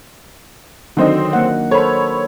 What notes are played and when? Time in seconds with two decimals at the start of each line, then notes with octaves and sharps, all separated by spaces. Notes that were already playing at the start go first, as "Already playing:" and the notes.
0.97 D3 D#3 F#3 C4 D4 D#4
1.33 A#3 D#5 F#5
1.71 A4 A#4 C5 C#5 B5